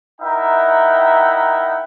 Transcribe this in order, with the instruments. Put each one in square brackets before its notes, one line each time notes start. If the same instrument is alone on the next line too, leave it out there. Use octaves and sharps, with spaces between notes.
[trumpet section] D#4 E4 A#4 E5 F#5 G5